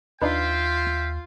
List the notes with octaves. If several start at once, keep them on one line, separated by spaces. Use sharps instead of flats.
D#2 D4 D#4 F4 B4 E5 F5 G5